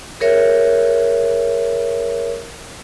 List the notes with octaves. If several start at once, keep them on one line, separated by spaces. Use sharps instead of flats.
G#4 A#4 C#5 E5